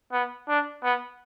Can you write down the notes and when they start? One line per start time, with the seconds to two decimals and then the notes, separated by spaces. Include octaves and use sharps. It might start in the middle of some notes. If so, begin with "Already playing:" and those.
0.13 B3
0.48 D4
0.84 B3